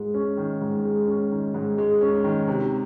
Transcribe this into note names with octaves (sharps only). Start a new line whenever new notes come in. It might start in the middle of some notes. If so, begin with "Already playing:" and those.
Already playing: G#2 G#3
C#4
D#3
G#2
G#3
C#4
D#3
G#2
G#3
C#4
D#3
C3